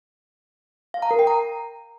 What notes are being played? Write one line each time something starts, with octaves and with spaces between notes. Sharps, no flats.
F5
A#5
A#4
G5
A#5